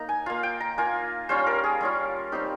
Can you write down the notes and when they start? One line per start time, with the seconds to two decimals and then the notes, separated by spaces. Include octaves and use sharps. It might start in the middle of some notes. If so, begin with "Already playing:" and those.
Already playing: A#3 D#4 A#5
0.09 G#5
0.26 A#3 F4 F5
0.43 G5
0.60 A#5
0.78 A#3 F4 G#5
1.29 G3 C#4 F4 C5
1.47 A#4
1.64 G#4
1.81 G3 C#4 F4
2.32 G3 C4 D#4 G4